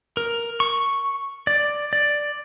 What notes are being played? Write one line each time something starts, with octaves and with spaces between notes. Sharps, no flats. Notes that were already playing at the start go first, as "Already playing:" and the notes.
A#4
C#6
D5
D5